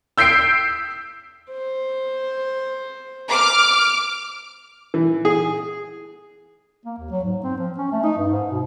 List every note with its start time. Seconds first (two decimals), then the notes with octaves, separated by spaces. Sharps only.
0.18 E6 G6 B6 C7 D7
1.50 C5
3.30 D6 F6
4.94 E3
5.25 G#4
6.85 A#3
6.98 D#2
7.11 F#3
7.24 G#2
7.43 C4
7.57 F3
7.78 C#4
7.92 A3
8.03 D#4
8.17 G2
8.30 G#2
8.51 B2